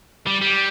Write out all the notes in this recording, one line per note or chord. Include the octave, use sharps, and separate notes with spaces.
G3
G3